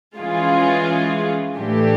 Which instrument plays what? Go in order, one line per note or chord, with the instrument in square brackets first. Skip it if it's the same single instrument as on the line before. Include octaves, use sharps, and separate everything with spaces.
[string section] E3 G#3 C#4 F4 G#4
A2 E3 A3 D4 G4